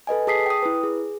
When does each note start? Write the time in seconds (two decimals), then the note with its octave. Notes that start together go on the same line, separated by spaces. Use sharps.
0.07 A4 B4 D#5 G#5
0.27 G#4 A5 D#6 B6 C7
0.46 G5 D#6
0.63 E4 B4
0.83 G#4